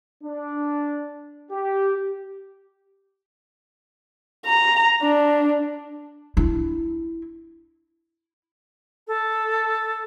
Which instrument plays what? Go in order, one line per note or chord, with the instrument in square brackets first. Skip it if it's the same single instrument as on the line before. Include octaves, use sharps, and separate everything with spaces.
[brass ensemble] D4
G4
[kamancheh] A#5
D4
[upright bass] D4 E4
[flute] A4